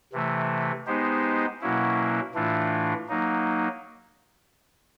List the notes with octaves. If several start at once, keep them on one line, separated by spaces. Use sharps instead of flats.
C3 E3 A3
G#3 B3 D#4 G4 C5
B2 F#3 A#3 C#4 E4
A2 E3 A3 D4 F4
F#3 A#3 D#4